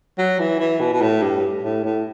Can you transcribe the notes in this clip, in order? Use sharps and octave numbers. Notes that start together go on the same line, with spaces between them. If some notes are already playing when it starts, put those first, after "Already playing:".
F#3
E3
E3
B2
B2
A2
G2
A2
A2